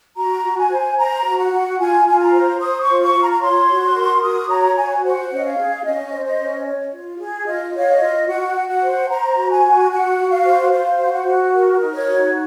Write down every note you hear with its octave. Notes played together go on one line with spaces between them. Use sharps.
F#4 A#5
F#4
G#5
C5
C5 A#5
F#4
F#5
F#4
F4 G#5
F4 G#5
A#5
C5
C5 D#6
C#6
F4
C#6
F4
A#5
A#5
C#5 C6
F#4
A#4
F#4 D#6
C#5 A#5
F#4 G#5
C5 F#5
C#4
D#5
F5
G#4
C#4 D#5
C5
D#5
C#4
C#5
F4
G#4
F4 D#5
C#5 F5
D#5
F4
F#4 F#5
F#4
F#5
C5
C5 A#5
F#4
G#5
F#4
F#4 F#5
F#4
F5
C5
C5 F5
F#4
F#5
F#4
A#4
D#4
C#5
F#4